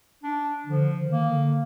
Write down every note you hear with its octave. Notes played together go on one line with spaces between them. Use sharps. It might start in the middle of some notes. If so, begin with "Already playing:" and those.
D4
D3 F3
D#3
A#3
D3